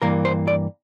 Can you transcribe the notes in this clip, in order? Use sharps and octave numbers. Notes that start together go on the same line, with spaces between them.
G2 E3 A#3 A#4
C5
D5